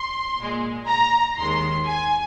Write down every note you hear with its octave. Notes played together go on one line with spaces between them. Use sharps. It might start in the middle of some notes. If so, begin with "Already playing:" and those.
Already playing: C6
A#2
G#3
A#5
D#2 D#3 G#3 C6
G#5